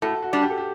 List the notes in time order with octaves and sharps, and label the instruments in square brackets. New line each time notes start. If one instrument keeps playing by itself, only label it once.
[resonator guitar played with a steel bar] A2 [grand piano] F#4 A4
[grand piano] F#4
[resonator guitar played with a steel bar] G3 D4
[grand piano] G4
A4
G4